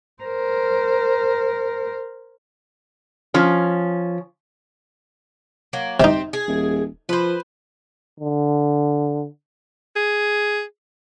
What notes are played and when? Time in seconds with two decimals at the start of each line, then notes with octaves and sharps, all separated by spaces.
0.23 A#4 C5
3.34 F3 C#4
5.73 F#3 A#3
6.00 C3 C4 D#4 G4
6.33 G#4
6.48 D#1
7.09 F3 B4 C5
8.20 D3
9.96 G#4